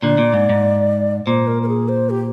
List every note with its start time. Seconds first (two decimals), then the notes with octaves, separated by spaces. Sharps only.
0.02 A#2 D3 D5
0.18 A#2
0.34 G#2
0.49 G#2
1.27 A#2 C5
1.47 A#4
1.63 A#4
1.69 G#4
1.89 C5
2.10 G4